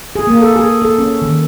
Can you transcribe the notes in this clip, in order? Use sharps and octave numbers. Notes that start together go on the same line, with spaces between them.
G#4
A#3
A4
G#4
A4
C#4
D#3